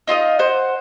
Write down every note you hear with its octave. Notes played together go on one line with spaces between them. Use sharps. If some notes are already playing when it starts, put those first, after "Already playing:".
D#4 F4 A4 D#5
C5 F#5